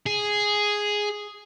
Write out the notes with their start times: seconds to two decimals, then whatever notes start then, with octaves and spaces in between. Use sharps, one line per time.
0.06 G#4